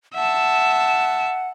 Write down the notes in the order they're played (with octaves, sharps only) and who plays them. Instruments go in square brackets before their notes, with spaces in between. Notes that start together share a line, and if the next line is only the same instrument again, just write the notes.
[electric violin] E5 A5 [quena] F#5